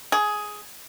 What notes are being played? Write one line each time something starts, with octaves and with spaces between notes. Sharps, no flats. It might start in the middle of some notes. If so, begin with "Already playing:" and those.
G#4